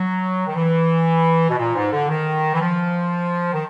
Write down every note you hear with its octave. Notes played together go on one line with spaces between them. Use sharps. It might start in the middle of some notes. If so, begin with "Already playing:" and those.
Already playing: F#3
D#3
E3
B2
A#2
G#2
D3
D#3
E3
F3
D#3